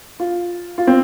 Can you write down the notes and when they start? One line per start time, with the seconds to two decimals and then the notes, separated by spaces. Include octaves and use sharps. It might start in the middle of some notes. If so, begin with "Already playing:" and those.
0.20 F4
0.78 F4
0.87 C4